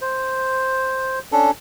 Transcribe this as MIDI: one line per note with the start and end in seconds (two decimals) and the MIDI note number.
0.02 1.19 72
1.32 1.51 61
1.32 1.51 62
1.32 1.51 69